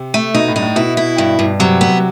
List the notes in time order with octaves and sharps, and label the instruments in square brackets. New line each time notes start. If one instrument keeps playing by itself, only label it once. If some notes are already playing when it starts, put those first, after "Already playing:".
Already playing: [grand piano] C3
[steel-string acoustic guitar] A3
[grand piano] B2 [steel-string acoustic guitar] D#4
[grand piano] A2
[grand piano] G2 [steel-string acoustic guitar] D#4
[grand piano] A2
[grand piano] B2 [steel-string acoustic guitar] E4
[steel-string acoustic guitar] E4
G2
G2
[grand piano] C3 [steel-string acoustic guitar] F#3
[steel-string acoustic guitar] B3